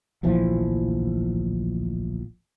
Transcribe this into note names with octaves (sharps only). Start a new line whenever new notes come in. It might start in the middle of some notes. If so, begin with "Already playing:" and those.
D1 A#1 E3 F3